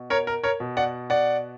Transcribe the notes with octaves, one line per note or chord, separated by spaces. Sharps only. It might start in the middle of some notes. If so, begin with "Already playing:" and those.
Already playing: B2
A#4 C#5
A#4
A#4 C#5
B2
D5 F#5
D5 F#5